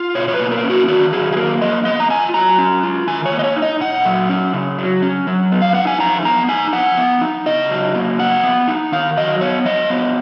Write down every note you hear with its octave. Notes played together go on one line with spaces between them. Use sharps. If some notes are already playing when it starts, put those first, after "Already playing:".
Already playing: F4
B2 C#5
C#5
B4
A#3
A#4
C#4
F#4
D#3 F#4
F#3 G#4
G#4
A#3 A#4
F3 D#5
B3 D#5
A#5
F4 G#5
F#3 A#5
C#4
F4
D#3 G#5
C#5
A#3
D#5
C#5
D#4
D#5
A#2 F#5
F#3
C#4
C#3
F#3
C#4
F#3
B3
F5
D#4 F#5
G#5
F3 A#5
B3 A#5
D#4 G#5
F3 F#5
B3
D#4
C#3 D#5
F#3
A#3
F3 F#5
B3
D#4
D#3 F5
F#3 D#5
B3 C#5
F3 D#5
B3